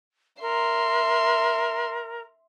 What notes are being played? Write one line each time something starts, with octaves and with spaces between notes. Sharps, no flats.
A#4 E5 C6